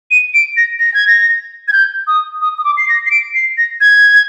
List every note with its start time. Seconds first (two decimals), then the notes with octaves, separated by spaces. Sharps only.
0.11 D#7
0.34 D7
0.57 A#6
0.79 A#6
0.94 G#6
1.07 A#6
1.68 G#6
1.73 G6
2.07 D#6
2.42 D#6
2.58 D#6
2.64 D6
2.77 C7
2.89 A#6
3.06 C7
3.11 D7
3.34 C7
3.58 A#6
3.81 G#6